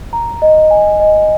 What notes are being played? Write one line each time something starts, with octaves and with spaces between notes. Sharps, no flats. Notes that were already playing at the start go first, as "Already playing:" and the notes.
A#5
D#5
G#5
D#5